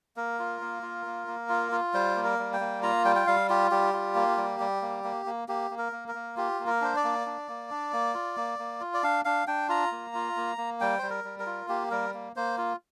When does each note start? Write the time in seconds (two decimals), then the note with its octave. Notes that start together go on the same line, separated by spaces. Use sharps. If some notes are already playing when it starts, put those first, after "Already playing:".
0.16 A#3 A#4
0.39 F4
0.61 A#3
0.83 F4
1.06 A#3
1.27 A#3
1.49 F4
1.72 F4
1.94 G3 C5
2.16 A#3
2.24 A#4
2.39 G3
2.53 G5
2.60 A#3
2.83 F4 A#5
3.05 G3 G5
3.16 G5
3.27 G3 F5
3.49 F4 G4
3.71 G3 G4
3.93 F4
4.15 A#3
4.37 G3
4.60 G3
4.81 A#3
5.04 A#3
5.26 A#3
5.48 A#3 G4
5.71 A#3
5.78 A#4
5.92 A#3
6.08 A#4
6.15 A#3
6.37 F4 G4
6.60 A#3
6.67 A#4
6.81 D4 C5
6.96 D5
7.04 A#3
7.26 D4
7.48 A#3
7.70 D4
7.93 A#3
8.14 F4
8.37 A#3
8.59 A#3
8.80 F4
8.94 D5
9.03 D4 F5
9.25 D4 F5
9.47 D4 G5
9.69 F4 A#5
9.92 A#3
10.15 F4
10.37 A#3
10.58 A#3
10.81 G3 G5
10.99 G3 C5
11.10 A#4
11.24 G3
11.40 A#4
11.46 F4
11.68 A#3 G4
11.91 G3 A#4
12.14 A#3
12.36 A#3 C5
12.58 F4